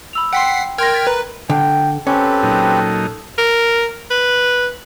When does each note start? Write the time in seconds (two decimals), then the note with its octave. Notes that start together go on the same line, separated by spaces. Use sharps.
0.13 B5 E6 F7
0.33 F#5 G5 C6 B6 C7
0.78 A#4 G5 C6 F6 G#6 A#6
0.94 A6 B6
1.07 B4 A#5
1.50 D3 G5
2.07 C4 C#4 G4 A4 B4
2.43 A#2 F#3 D#4
3.38 A#4
4.11 B4